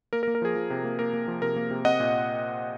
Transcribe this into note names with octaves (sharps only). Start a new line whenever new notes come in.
A#3 A#4
A#4
A#3
A#4
F3 G#4
F3
C3
A#3
A#3 A#4
A#3
F3
C3 A#4
A#3
C3
C4 D#5 F#5
A#2